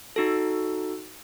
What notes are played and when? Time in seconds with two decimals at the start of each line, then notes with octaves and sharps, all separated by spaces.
0.16 D#4 F#4 A4